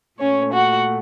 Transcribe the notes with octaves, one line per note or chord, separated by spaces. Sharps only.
A#2 A3 C#4 C#5
F#4 F#5